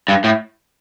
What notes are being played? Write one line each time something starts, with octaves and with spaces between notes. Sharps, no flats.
G2
A2